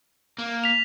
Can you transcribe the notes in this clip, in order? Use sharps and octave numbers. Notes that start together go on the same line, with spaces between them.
A#3
B6 F7